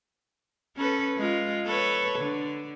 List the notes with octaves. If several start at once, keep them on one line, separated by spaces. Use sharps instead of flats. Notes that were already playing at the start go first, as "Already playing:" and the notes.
C#4 A4 B4
G#3 F4
A4 B4 C#5
D3